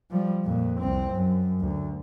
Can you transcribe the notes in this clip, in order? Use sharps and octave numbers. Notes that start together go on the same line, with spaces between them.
F3 G3
F2 A#2
C2 C4
F#2
D2